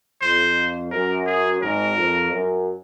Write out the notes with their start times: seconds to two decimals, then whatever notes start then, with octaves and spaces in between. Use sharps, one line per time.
0.22 F2 C5
0.92 F#2 A#4
1.26 G#4
1.62 G#1 G#2 A#4
1.97 F2
2.32 F#2